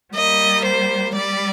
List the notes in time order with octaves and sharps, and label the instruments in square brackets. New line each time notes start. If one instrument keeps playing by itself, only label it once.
[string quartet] G3 A#3 [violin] D#5
[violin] C5
[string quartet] G3 [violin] D5